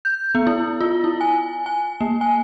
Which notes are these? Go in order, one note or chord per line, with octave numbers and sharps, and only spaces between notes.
G6
B3
E4
F4
E4
G#5
G#5
A#3
G#5